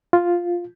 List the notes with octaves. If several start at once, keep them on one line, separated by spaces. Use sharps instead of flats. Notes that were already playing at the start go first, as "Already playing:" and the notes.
F4